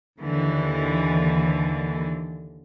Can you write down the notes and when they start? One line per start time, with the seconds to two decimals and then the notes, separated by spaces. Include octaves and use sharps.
0.19 D#2 D3 E3